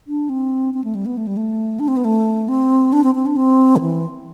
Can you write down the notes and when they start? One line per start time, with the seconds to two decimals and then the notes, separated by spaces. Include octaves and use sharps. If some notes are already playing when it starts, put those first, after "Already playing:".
0.07 D4
0.29 C4
0.74 C4
0.84 A3
0.95 G3
1.06 B3
1.17 A3
1.27 G3
1.37 A3
1.80 D4
1.88 C4
1.97 B3
2.05 A3
2.48 C4
2.93 D4
3.04 C4
3.15 C4
3.26 D4
3.36 C4
3.76 D3
3.81 E3